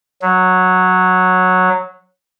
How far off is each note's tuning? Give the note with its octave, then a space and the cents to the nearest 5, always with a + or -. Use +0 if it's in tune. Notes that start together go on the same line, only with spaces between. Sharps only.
F#3 -10